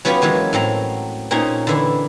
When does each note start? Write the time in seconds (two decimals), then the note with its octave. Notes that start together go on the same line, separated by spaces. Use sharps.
0.05 F#3 B3 C#4 F4 G4 G#4
0.22 E3 F#3 G#3 A#3
0.53 A2 F#3 C4 A#5
1.31 A#2 C4 C#4 D#4 G#4 A#5
1.67 D3 E3 E4